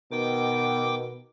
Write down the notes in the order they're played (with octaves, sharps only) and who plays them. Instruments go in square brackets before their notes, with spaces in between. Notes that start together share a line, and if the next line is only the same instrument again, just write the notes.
[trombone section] B2 B3 [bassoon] D#3 [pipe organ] G5 D6